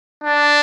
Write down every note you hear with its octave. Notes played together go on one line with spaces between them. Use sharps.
D4